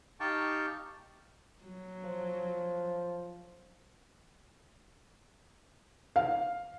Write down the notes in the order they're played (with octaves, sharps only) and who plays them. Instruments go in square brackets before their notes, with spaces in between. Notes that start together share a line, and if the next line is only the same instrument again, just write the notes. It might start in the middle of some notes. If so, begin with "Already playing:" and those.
[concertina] D#4 G4 F5 G5 A5 C#6
[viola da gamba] F#3
[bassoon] F3
[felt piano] F5